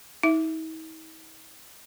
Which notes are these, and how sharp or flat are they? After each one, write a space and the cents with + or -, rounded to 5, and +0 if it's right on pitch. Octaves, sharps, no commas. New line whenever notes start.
D#4 +45 E5 +0